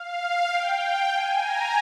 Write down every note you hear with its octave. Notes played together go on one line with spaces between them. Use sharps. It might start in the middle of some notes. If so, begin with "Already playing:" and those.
Already playing: F5
G5
G#5
A#5